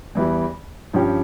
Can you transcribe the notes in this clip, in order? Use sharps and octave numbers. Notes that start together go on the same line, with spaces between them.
E2 E3 G3
G2 F3 C#4 G4